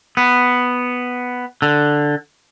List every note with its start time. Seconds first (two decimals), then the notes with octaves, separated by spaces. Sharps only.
0.17 B3
1.62 D3